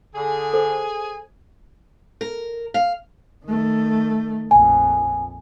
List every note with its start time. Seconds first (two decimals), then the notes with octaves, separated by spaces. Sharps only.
0.15 D3 G#4 G#5
0.53 A4 C5
2.21 A#4
2.74 F5
3.45 D#3 A3
4.51 A#1 F2 G#5